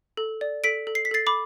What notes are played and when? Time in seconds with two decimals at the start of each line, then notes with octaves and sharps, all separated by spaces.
0.17 A4
0.41 D5
0.64 A4 B6 D7
0.87 A4
0.95 C7
1.05 B6
1.11 A4 A6 C7
1.27 B5 D6